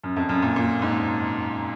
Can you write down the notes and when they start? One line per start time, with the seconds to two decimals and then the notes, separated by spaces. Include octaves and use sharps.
0.04 F#2
0.16 F2
0.29 F#2
0.42 A#2
0.56 A#2
0.82 G#2